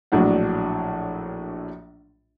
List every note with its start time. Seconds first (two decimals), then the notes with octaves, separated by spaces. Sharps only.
0.12 A#1 A2 F#3 D4 F#5